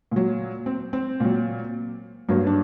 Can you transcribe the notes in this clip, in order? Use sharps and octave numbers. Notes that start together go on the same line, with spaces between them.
A#2 F#3
C4
C4
A#2 F#3
G2 F#3 A#3
D4